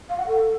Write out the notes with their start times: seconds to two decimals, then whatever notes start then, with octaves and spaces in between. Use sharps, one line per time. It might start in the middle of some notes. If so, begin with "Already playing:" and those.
0.09 F5
0.18 F#5
0.27 A4